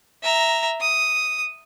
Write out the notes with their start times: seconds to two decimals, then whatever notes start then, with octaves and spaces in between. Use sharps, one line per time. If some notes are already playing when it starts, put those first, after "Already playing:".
0.23 E5 A#5
0.81 D#6